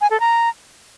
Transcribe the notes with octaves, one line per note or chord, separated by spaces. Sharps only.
G#5
A4
A#5